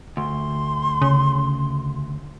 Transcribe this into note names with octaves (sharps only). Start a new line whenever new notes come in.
D2 C6
C#3